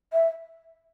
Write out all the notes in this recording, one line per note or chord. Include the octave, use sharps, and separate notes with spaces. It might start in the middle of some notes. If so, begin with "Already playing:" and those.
E5